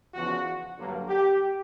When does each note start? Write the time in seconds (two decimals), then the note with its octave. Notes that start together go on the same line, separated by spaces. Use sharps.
0.13 E2 C#3 F3 F#4
0.76 G2 D3 F#3 A#3
1.08 G4